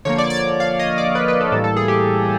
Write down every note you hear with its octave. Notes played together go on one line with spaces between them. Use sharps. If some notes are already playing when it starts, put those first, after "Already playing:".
D3 F3 A#3 C#5
D5
D5
D5
F5
D#5
D5
B4
B4
A4
A2 E3 G3 A#3 A4
A4
G#4
G4